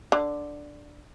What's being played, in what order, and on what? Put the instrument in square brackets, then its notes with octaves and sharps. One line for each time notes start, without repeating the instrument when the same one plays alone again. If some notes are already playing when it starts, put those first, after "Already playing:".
[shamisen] D3